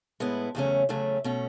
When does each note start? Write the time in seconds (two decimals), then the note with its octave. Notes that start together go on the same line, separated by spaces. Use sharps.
0.20 A2 G#3 B3 E4
0.55 E2 C#3 F#3 A3 C#4
0.89 E2 C#3 F#3 A3 C#4
1.24 B2 A3 C#4